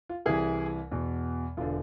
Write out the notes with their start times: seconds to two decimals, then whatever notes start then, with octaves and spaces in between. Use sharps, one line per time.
0.09 F4
0.26 C2 C3 E3 E4 G#4
0.91 E2 B2
1.57 E1 D3 F4